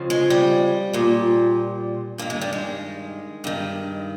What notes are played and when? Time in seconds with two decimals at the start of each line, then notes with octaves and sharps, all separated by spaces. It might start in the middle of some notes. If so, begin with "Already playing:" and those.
Already playing: F2 C#3 F3
0.10 G#3
0.30 G3
0.93 A#2 F3
2.18 G2 D#3 A#3
2.30 G#3
2.41 G3
2.53 G#3
3.44 G2 D#3